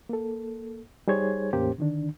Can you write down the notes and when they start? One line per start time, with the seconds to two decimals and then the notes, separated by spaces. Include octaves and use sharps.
0.09 A#3 A4
1.08 G3 D#4 G#4 C5 C#5 G#6
1.53 E2 A2 A#3 C#4 G4 C5
1.78 D3 D#3 D4